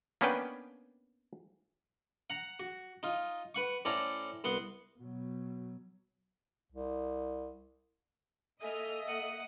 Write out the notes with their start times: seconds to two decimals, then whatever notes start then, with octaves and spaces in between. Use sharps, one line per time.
0.21 A#3 B3 C#4 D4 B4 G5
2.30 F#5 A#5
2.60 F#4
3.03 D#4 F4
3.55 B4 F#5 C#6
3.85 A2 C#4 A4 C5 D5 A#5
4.44 C2 B3 F#5 C6
4.99 B2 F#3
6.72 C2
8.62 A#3 A4 D#5 E5 G#5 F6
9.07 F#5 D#6